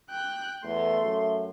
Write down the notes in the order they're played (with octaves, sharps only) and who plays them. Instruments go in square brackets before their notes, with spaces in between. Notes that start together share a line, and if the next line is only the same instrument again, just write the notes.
[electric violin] G5 F#6
[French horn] E2 [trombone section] A3 [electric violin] C6
[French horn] F#2